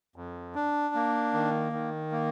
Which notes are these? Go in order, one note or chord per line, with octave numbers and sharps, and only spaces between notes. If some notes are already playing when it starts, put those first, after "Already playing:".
F2
D4
A#3
D#3
D#3
A#3